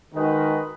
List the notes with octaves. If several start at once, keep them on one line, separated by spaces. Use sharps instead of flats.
D#3 G#3 D#4 F#4 B4 D#5